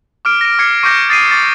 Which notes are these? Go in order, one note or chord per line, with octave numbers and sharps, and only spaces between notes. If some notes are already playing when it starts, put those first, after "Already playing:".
D6 F6 D7
A#6 D7
D6 G#6 C7 C#7
C#6 D6 F6 G6 A#6 D7
D#6 A6 A#6 C7 D7 D#7
D6 A6 B6